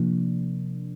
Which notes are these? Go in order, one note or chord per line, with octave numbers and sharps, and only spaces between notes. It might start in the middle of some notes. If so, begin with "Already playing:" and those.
Already playing: C3 F3 A#3 D4